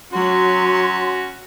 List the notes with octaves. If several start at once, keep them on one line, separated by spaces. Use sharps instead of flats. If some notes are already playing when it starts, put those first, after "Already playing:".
F#3 C#4 F#4 C6